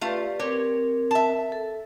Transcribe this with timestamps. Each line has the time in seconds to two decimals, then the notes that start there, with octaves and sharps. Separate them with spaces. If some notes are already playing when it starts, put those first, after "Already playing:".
0.01 A3 F4 G4 B4 D5 F5
0.39 C4 G4 A#4 C#5
1.11 E5 A5
1.52 A4